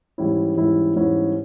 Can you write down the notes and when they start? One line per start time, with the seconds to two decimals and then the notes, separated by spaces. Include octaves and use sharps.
0.18 G#2 E3 G3 C#4 E4
0.57 G#2 E3 G3 C#4 E4
0.96 G#2 E3 G3 C#4 E4